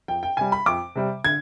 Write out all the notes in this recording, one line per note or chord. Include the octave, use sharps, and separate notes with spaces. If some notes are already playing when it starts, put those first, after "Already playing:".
F2 G5
G5
C3 G3 G#5
B5
F2 D6
C3 G3
D3 G#6